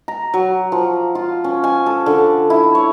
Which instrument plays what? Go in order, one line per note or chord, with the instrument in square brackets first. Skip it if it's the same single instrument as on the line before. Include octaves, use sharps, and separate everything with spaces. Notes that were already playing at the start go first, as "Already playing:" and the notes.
[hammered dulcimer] A#5
F#3
F3
F4
C#4
G#5
A4
D3
E4
C#5